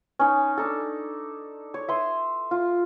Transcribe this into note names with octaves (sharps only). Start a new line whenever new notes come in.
C#4 D#4
D4 D#4 A4
C#5
E5 C6 D#6
F4